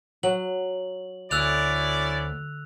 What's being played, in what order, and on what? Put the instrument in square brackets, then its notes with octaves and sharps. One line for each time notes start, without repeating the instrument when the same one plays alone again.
[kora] F#3 [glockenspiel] F#7
[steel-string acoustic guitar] D2 [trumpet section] C#4 E4 D5 [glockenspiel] E6 F#6 F7